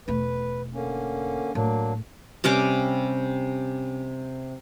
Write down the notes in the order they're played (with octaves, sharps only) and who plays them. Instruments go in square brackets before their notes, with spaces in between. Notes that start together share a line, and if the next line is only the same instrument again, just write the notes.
[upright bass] E1 A3 [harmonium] B4
[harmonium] D3 A#3 C#4
[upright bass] A2 [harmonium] F#3 A#3 D4
[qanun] C3 G3 C#4 D6